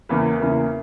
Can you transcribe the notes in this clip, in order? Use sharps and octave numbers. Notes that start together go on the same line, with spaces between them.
E2 C#3 E3 A#3 B4
E2 C#3 E3 A#3